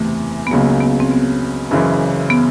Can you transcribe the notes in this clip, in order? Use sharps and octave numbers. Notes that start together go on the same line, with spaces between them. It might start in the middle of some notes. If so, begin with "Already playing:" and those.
Already playing: F#1 E2 C3 E3 A3
B3
C#2 C#3 F#3 A#3
B3
C4
B3
F#1 F#2 C#3 E3
B3